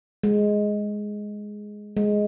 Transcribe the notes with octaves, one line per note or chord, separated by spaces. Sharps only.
G#3
G#3